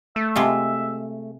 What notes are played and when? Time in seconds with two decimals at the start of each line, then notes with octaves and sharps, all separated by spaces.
0.16 A3 E5
0.36 C3 G#3 F4